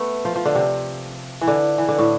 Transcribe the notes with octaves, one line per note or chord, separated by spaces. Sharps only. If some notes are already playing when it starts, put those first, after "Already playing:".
Already playing: A3 B3
F3
F3
D3
C3
E3
D3
E3
D3
A2